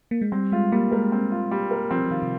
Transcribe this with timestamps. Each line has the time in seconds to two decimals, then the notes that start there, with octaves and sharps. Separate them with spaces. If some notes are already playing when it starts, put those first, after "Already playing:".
0.11 A#3
0.21 G#3
0.32 G3 C4
0.52 G#3 F4
0.72 G3 A#3
0.91 G#3 A#4
1.12 C4
1.32 F4
1.51 G3
1.71 A#4
1.91 F3 C4
2.05 F3
2.11 D#3 F4
2.22 C3